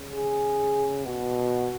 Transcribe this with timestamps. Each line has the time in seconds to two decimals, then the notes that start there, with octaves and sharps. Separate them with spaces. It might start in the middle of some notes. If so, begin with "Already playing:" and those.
Already playing: C#3
0.14 G#4
1.05 B2 F#4